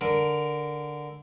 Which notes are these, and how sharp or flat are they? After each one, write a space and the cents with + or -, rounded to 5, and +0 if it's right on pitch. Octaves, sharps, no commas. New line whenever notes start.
D3 +0 A#4 +0